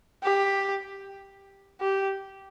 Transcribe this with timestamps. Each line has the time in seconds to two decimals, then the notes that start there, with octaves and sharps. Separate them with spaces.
0.23 G4
1.81 G4